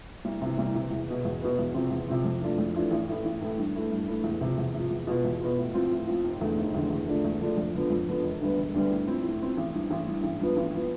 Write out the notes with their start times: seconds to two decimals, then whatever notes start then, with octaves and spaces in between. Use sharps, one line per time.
0.25 C2
0.42 C3 E3
0.58 C2
0.75 C3 E3
0.91 E2
1.08 B2 B3
1.25 E2
1.41 B2 B3
1.59 E2
1.74 C3 F3 C4
1.91 E2
2.08 C3 F3 C4
2.25 F2
2.41 E3 A3 D4 F4
2.58 F2
2.74 E3 A3 D4 F4
2.91 A1
3.08 A2 E3 A3 E4
3.25 A1
3.41 A2 E3 A3 E4
3.58 G2
3.75 E3 A3 E4
3.91 G2
4.08 E3 A3 E4
4.24 E2
4.41 C3 F3
4.58 E2
4.74 C3 F3
4.91 E2
5.07 B2 B3 F4
5.25 E2
5.41 B2 B3 F4
5.58 A2
5.74 F3 C4 F4
5.91 A2
6.08 F3 C4 F4
6.24 F1
6.41 E2 D3 A3
6.58 F1
6.75 E2 D3 A3
6.90 E2
7.07 D3 F3 A3 D4
7.24 E2
7.40 D3 F3 A3 D4
7.57 F2
7.75 D3 F3 B3
7.90 F2
8.07 D3 F3 B3
8.24 E1
8.41 D2 D3 G3 B3
8.58 E1
8.74 D2 D3 G3 B3
8.91 A2
9.07 F3 C4 E4
9.24 A2
9.41 F3 C4 E4
9.57 A1
9.74 G2 E3
9.91 A1
10.08 G2 E3
10.24 A1
10.40 G2 F3 B3
10.57 A1
10.74 F3 B3